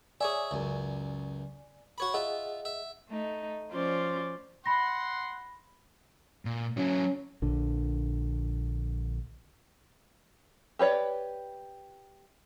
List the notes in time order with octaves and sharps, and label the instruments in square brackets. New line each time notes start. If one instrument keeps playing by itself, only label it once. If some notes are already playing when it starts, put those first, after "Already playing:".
[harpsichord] G#4 C#5 E5 [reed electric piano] D5 G#5
[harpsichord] C#2 F#2
F#4 C#5 B5
[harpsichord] F4 E5 [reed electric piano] G#4 D#5 F#5
[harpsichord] E5
[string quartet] A3 D#4
F3 C#4 F4 C5 D5
[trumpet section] F#5 C6 [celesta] B5 A#6
[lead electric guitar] A#2
[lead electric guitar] F#3 E4 [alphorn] C#4
[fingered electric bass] A#1 D3
[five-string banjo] G4 B4 C#5 D5